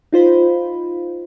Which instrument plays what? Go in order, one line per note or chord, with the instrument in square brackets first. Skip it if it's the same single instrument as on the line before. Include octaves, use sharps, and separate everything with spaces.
[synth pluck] D#4 F4 C5 B5